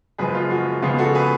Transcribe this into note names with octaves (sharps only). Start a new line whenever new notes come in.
F#1 F#2 F3 G#3 G#4 B4
F4
F#4
C#2 C#3 F3 G#3 B3 F4 G#4
F#4 A4
G#4 B4